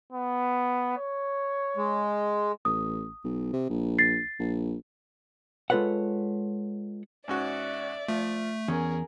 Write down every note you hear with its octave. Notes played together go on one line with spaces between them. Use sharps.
B3
C#5
G#3
A1 D#6
B1
C3
A#1
A6 C7
A#1
G#3 F4 A4 B4 C#5 F#5
G#2 C#4 F#4 D5 E5
F3 A3
E2 C#4 G#4 A#4